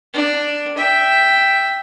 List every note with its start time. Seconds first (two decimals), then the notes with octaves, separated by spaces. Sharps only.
0.14 D4
0.77 E5 G5